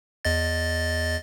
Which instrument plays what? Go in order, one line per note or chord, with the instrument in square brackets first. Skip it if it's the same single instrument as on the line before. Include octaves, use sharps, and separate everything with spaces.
[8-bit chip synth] E2 D#5 A6